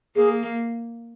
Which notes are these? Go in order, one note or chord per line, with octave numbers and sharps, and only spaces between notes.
A#3 G#4